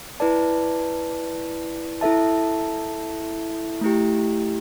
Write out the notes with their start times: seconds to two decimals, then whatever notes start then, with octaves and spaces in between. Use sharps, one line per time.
0.20 E4 B4 D5 A5
2.01 E4 A4 E5 A5
3.81 A3 E4 G4